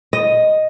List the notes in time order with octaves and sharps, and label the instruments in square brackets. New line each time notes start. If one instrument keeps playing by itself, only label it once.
[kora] D#5